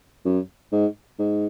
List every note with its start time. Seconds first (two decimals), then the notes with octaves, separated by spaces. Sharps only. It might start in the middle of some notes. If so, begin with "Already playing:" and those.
0.25 F#2
0.72 G#2
1.19 G#2